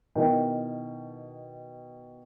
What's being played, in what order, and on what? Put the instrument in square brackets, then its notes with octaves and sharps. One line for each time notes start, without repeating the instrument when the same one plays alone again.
[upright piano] B2 D#3 E4 A#4 D#5 G5